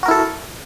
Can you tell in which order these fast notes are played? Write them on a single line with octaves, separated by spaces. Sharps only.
F#4 A#4 E4 A4